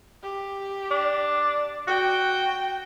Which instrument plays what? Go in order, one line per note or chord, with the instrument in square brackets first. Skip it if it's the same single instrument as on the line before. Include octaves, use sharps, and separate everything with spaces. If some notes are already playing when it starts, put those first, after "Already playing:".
[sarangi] G4
[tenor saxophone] D4
[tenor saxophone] F#4 [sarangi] G5